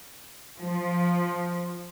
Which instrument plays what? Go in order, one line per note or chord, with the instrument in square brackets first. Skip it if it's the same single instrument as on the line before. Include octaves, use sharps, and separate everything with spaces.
[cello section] F3